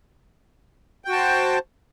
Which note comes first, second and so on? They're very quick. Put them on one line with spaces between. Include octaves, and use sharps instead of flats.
G5 F#4 A5 C5